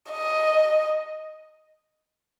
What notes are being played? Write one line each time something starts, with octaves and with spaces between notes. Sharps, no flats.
D#5